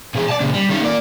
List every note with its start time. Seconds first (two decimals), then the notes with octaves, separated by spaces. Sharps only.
0.15 B2 G#4
0.29 D5 A5
0.40 A#2 C#3
0.54 G3
0.69 D#3 C#4
0.81 A#3 D5